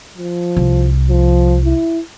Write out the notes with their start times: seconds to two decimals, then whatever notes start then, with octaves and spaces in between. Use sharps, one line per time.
0.17 F3
0.57 C2
1.09 F3
1.64 E4